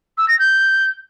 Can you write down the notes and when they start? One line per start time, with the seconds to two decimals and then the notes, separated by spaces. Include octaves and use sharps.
0.18 E6
0.28 A#6
0.39 G6